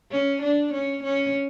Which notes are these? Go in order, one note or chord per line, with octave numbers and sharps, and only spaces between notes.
C#4
D4
C#4
C#4